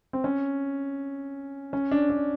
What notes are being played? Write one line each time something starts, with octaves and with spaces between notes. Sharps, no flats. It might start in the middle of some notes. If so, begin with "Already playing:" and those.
C4
C#4
C#4
D4
D4